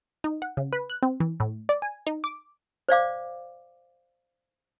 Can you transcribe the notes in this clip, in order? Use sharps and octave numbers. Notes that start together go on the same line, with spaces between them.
D#4
F#5
C#3
B4
F#6
C4
E3
A2
D5
G#5
D#4
D6
C5 D5 F5 D6